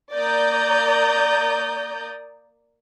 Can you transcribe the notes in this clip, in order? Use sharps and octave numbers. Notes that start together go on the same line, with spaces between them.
A#3 D5 A#5 D#6 G6